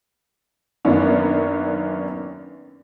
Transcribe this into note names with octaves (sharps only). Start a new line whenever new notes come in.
F#2 D#3 A#3 B3 C#4 D4